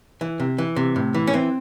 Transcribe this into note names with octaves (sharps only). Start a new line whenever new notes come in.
E3
C3
E3
C3
A2
E3
C#4
E3 C4